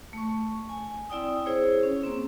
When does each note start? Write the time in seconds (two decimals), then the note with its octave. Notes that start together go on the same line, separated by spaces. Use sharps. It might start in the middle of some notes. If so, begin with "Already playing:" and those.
0.13 A3 C#6
0.69 G#5
1.10 C4 E4 D5 G5 D#6
1.46 E4 G#4 C5 C#5
1.83 C#4
2.03 A#3 C4